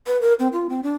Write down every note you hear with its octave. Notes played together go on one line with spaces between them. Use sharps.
B4
A#4
C4
F4
C4
D4